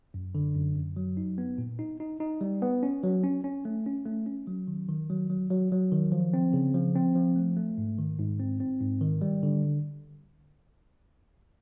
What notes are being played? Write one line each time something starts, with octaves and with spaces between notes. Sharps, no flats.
F#2
D3
F#2
F#2
F#3
D#4
B3
A#2
D#4
D#4
D#4
G3
B3
C#4
F#3
C#4
C#4
A3
C#4
A3
C#4
F#3
D#3
D#3
F#3
F#3
F#3
F#3
D#3
F3
C4
C#3
F3
C4
F3
A3
A3
G#2
D#3
G#2
C4
C4
G#2
D#3
G3
D3